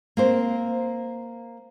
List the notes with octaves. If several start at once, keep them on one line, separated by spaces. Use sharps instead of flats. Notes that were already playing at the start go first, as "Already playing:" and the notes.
A#3 C4 C5